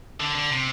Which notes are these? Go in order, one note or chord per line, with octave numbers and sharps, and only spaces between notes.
D3
D3
C3